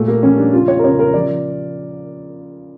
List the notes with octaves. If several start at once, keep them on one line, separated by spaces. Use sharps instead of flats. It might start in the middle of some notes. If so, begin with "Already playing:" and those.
Already playing: A#2 A3
A#3
F3 C#4
D4
C#3 F4
C#5
A#4
C#3 C#5
A#4
F3 D5